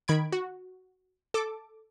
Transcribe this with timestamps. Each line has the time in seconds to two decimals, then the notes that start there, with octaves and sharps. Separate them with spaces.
0.08 D#3 B5 G#6 D7
0.32 F#4
1.34 A4 D6